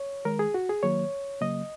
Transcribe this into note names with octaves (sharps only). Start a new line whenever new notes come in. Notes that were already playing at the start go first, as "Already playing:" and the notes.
Already playing: C#5
D#3 G#3 A#4
G#4
F#4
G#4
D#3 F#3 A#3 C#5
C#3 F#3 A#3 D#5